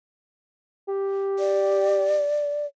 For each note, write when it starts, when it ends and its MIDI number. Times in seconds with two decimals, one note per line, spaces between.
0.88 2.26 67
1.39 2.66 74